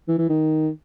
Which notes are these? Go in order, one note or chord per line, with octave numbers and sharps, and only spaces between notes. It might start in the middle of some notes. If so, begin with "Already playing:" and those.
E3
E3
D#3